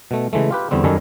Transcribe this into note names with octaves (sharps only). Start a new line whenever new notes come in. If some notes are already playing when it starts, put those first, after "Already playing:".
B2 A3
C#3 E3 G#3 A3
F4 G4 B4
E2 D3 G3 C4
F#2 D#3 G3 A4 C#5 G#5